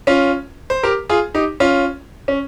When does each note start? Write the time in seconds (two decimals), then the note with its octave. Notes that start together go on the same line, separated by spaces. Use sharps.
0.07 C#4 F4
0.70 C5
0.83 G4 A#4
1.10 F4 G#4
1.34 D#4 G4
1.60 C#4 F4
2.28 C#4